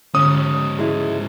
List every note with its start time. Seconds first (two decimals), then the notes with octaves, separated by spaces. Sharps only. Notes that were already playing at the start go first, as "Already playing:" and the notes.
0.15 G#2 D3 C#4 D#6
0.79 G#3 E4